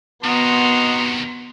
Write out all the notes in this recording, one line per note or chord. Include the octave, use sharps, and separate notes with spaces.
C3 D#3 B3 F#4 D#5 A#5 C6